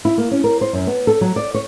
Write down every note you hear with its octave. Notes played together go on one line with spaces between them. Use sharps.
E4
A#3
C#4
A#4
C5
F#2
B3
A4
F#3
D5
C#5